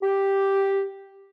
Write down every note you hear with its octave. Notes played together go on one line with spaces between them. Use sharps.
G4